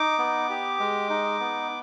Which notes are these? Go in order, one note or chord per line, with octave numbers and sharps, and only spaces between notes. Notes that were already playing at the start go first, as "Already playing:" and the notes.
Already playing: D#4 D6
B3
G4
G#3
D#4
B3